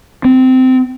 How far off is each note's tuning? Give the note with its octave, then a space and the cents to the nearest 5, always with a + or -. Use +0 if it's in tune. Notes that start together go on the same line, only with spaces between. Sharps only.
C4 -20